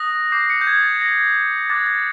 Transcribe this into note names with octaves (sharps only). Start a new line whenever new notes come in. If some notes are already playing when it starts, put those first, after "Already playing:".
Already playing: D#6 F#6 A#6
D6 G6 C7
C#7
G6
G#6
A6
A#6
D6 F#6 A6
A6